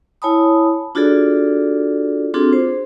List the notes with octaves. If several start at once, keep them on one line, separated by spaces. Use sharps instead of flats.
E4 C#5 G#5 A5 B5 D#6
D4 F4 F#4 G#4 A4 D5
C4 D4 F4 F#4 G#4 A4
C5